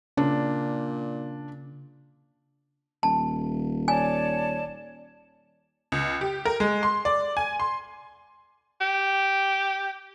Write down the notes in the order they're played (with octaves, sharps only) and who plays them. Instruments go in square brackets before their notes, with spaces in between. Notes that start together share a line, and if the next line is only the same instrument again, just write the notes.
[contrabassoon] A#2 [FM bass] C#3 [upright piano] D4
[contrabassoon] D#1 [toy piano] A5
[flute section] C#5 D5 A5 [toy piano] G#5
[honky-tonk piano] C#2
G4
A#4
G#3
C6
D5
G#5
C6
[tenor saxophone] G4